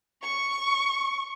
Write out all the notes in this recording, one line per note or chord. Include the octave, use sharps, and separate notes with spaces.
C#6